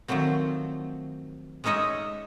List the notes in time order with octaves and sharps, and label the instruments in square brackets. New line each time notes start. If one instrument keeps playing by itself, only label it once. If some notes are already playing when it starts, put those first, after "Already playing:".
[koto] D#3 F3 F#3 A3 C4
G#3 C#4 D#4 C#5 D#5 E5